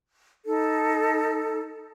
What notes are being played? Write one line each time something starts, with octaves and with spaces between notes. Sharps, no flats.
D#4 A4